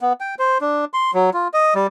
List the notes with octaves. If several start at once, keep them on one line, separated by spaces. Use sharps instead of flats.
B3
G5
C5
D4
C6
F#3
F4
D#5
G3